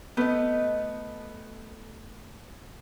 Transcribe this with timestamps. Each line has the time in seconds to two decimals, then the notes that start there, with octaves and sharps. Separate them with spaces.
0.17 A3 B3 D#5